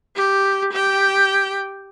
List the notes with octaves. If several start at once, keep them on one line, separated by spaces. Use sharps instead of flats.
G4
G4 G5